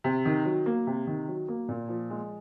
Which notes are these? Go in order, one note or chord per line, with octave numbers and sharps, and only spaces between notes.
C3
D#3
F#3
A#3
C3
D#3
F#3
A#3
A#2
F3
G#3